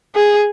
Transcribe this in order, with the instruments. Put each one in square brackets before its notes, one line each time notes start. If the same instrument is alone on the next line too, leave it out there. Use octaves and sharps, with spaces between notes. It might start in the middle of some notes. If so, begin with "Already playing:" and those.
[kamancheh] G#4